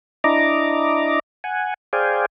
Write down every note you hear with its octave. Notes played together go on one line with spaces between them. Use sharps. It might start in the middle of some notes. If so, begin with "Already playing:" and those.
D4 E4 D#5 A#5 D6
F#5 G#5
G#4 C5 D5 F5 G5 G#5